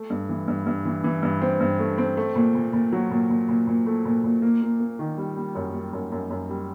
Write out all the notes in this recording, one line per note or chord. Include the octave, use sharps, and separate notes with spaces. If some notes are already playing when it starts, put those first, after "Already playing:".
Already playing: A3
G2
E3
G2
G2
E3
E3
G2
C4
G2
A3
C4
A3
A#2
A#2
A#2
F#3
A#2
A#2
A#2
A#2
A3
A#2
A#2
A#3
A#3
A#3
D#3
G3
G3
F#2
G3
F#2
F#2
F#2
G3